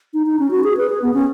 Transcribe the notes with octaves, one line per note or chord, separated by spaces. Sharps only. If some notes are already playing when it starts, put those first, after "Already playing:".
D#4
D#4
C#4
F#4
G#4
B4
G#4
B3
C#4